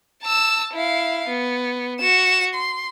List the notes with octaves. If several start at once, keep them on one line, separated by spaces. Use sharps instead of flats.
A5 E6
E4 F5
B3
F#4 E7
C6